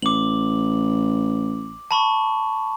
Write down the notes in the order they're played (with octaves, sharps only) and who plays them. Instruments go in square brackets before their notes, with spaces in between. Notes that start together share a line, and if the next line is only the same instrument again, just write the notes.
[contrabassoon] A1 [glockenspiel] D6 F#7
[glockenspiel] A5 B5 C#6